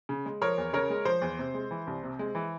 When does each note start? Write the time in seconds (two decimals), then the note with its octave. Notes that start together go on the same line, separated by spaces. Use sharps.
0.09 C#3
0.26 G#3
0.42 F3 A#4 C#5
0.58 E2
0.73 C#3 A#4 C#5
0.90 G#3
1.05 F3 C5
1.22 E2
1.39 C3
1.54 G#3
1.71 E3
1.87 C2
2.03 C3
2.19 G#3
2.35 E3